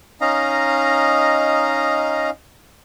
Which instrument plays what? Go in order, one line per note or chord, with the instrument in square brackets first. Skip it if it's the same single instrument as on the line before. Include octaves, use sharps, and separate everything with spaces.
[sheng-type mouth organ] C#4 D#4 D#5 F5 A#5